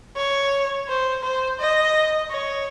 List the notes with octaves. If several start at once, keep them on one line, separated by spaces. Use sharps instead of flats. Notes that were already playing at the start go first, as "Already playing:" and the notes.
C#5
C5
C5
D#5
C#5